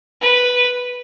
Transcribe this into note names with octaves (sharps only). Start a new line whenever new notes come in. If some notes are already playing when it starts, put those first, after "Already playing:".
B4